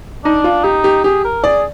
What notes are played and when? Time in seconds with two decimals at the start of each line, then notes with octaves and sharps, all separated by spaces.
0.25 D4 D#4
0.44 F4
0.64 D#4 G4
0.84 G4
1.04 G4 G#4
1.25 A#4
1.44 G#4 D5